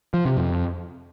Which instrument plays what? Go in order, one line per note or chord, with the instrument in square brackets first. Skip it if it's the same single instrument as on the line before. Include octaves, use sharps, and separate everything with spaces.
[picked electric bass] F3
C3
F2